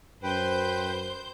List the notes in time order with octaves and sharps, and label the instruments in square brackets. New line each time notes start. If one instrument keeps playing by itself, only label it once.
[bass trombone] F#2 [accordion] B4 G5 [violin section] C5 G6